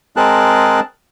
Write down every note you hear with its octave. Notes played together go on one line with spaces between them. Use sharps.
G#3 C4 G#4 A#4 A5 F#6